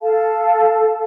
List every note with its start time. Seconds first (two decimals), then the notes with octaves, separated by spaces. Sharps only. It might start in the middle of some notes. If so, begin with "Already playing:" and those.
0.01 A4 F5 A5